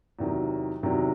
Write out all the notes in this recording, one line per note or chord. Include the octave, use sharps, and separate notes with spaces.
E2 C3 D#3 F#3
E2 C3 D#3 F#3